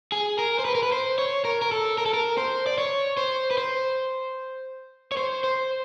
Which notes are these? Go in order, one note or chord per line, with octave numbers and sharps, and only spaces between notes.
G#4
A#4
C5
B4
A#4
B4
C5
C#5
A#4
A#4
A4
A#4
A4
A#4
C5
D5
C#5
C5
B4
C5
C#5
C5
C5